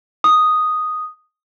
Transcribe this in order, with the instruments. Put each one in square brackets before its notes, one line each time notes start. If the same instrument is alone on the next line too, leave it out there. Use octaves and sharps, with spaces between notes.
[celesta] D#6